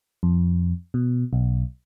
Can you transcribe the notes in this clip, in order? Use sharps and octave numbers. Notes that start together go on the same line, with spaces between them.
F2
B2
B1